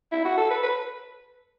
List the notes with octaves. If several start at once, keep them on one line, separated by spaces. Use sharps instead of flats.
E4
F#4
A4
B4
B4